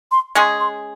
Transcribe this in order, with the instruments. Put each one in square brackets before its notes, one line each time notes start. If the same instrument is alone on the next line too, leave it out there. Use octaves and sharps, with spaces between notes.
[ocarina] C6
[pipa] G#3 C#4 G#4 [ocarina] C6
[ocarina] C6